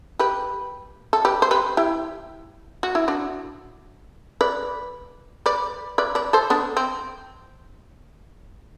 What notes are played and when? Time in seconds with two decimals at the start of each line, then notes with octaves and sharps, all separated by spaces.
0.19 G4 B4
1.13 A4
1.25 G4 B4
1.42 C5
1.51 G4 B4
1.77 E4 G4
2.83 F#4
2.95 E4
3.08 D4 F#4
4.41 B4 D5
5.46 B4 D5
5.98 B4 D5
6.15 B4 D5
6.33 A4 C5
6.50 B3 D4
6.77 C4